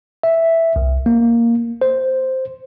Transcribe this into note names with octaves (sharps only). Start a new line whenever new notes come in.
E5
C2
A#3
C5